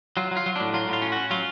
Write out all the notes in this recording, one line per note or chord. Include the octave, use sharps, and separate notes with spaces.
F#3 F4
F#3
F4
F#3
A2 D4
F#3 F4
A2 F4
C#4
C#4 F#4
F#3 F4